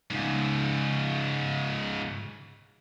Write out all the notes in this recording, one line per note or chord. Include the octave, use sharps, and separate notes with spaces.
G#2 C#3